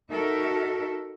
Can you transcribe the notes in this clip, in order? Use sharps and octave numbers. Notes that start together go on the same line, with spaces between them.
D#4 F#4 A4 A#4 E5